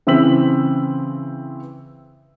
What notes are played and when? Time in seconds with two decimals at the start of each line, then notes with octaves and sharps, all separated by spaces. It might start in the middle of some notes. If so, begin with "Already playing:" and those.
0.07 C#3 E3 C4 E6 B6 F#7